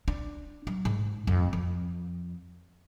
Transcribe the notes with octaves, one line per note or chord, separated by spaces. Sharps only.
D4
F#3
G#2
F2
F2